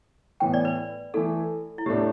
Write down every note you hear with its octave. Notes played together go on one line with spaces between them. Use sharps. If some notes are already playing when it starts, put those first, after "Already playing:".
A2 E3 B3 G5
D5
B4
E3 A3 E4 A4
E4
A2 A3 D4 G4